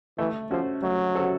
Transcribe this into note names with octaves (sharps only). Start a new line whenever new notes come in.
E3 A3
F3 C#4 F#4 A4 C5
F#3 A3
C#4 F#4 A4 C5